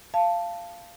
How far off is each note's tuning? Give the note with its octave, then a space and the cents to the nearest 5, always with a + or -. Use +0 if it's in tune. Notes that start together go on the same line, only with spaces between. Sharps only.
F5 -15 A5 +0